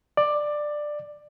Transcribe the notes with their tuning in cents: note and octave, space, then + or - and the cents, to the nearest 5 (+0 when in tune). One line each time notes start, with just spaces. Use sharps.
D5 +15